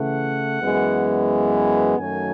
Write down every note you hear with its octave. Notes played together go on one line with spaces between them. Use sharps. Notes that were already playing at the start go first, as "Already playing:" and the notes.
Already playing: C#3 E3 A3 F#5
F#2 E3 G#3 B3
F#2 D#3 F#3 A3 G#5